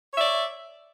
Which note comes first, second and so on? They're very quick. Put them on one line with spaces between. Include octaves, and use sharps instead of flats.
C#5 E5 D5